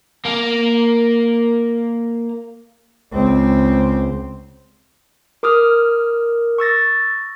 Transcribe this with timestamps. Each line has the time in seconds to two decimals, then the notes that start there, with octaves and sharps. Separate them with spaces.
0.25 A#3 A#4
3.12 C#2 C4
5.43 A#4 D6 D#6 F6
6.58 C#6 E6 A6 A#6